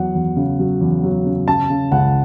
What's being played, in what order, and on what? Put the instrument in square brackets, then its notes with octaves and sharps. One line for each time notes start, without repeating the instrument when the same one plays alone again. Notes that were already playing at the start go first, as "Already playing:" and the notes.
Already playing: [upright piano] E2 F#3 F#5
E2
C#3
F#3
E2
F#3
C#3
C#3 A5
C#3
C#2 F#5